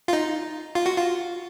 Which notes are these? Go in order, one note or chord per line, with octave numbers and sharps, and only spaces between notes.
F4
D#4
F4
F#4
F4